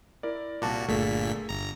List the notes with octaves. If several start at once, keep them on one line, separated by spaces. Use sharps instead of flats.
E4 A#4 D5
C2 A#2 F#4 A5 D6
G1 A#2 A3 G#4 A4 B6
G1 A#5